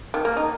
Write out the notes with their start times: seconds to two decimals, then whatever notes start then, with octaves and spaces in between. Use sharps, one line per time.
0.14 D#3
0.25 A#3
0.37 D#4